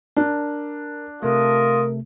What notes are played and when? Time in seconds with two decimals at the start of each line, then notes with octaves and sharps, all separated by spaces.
0.17 D4 A#4
1.23 C3 A3 F4 A#4 D#6